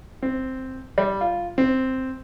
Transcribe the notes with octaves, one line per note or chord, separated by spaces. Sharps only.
C4
G3
F4
C4